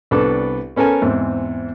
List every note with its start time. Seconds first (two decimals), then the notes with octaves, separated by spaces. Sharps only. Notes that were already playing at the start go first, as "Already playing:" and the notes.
0.11 C2 B3 D4 A4 B4 D6
0.76 B3 C#4 A4 A#4 G#5
1.02 E2 G#2 C4